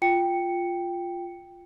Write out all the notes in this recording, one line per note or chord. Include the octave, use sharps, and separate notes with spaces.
F4 G5 C#7